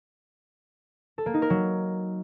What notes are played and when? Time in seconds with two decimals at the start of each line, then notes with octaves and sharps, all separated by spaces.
1.18 A4
1.26 A#3
1.34 D#4
1.42 A#4
1.50 F#3